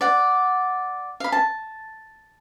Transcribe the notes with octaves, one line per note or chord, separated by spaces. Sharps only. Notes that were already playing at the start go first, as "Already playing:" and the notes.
D5 F#5
F5 B5
A5